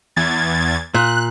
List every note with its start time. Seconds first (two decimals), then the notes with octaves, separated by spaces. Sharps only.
0.16 E2 G#6 A6
0.94 A#2 F#6